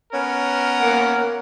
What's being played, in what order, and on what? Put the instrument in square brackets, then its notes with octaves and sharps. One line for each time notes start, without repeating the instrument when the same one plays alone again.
[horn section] B3 C#4 A#4
[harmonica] A#3 F#5